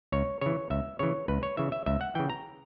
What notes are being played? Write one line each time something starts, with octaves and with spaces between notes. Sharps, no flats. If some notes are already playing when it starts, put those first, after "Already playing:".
C#2 C#5
C#3 E3 C#5
C#2 E5
C#3 E3 C#5
C#2 B4
C#5
C#3 E3 E5
E5
C#2 E5
F#5
C#3 E3 G5
A#5